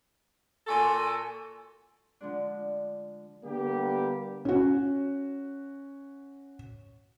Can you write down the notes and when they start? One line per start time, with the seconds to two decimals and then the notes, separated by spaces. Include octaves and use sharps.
0.67 A#2 F#4 A4 G#5 C6
2.21 D3 F3 G#3 D4
3.44 D3 G3 A#3 B3 G4
4.45 C#4 F#4